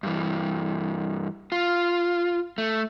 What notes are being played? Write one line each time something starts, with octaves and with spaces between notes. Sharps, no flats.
G2 E3
F4
A3